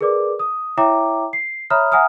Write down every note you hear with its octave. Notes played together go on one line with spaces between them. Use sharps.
G#4 A#4 B4 D5 D6
D#6
E4 C#5 E5 G5 A#5 D6
C7
C#5 E5 A#5 B5 D#6 F6
E5 F#5 G#5 A#5 D#6 F6